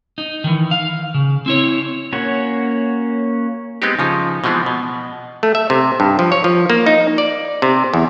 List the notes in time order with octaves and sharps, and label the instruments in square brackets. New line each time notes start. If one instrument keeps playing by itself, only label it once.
[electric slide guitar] D#4
D#3 E3
F5
C#3
C4 E4 C#5
[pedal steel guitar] A#3 C#4 F#4 C#5
[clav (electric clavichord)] G#3 B3 C4 D#4 G4
C#3 F3 D#4
B2 E3 F3 G#3 B3 C4
B2
A3
E5
C3
G2
F3
C#5
F3
A#3
D#4
D5
C3
E2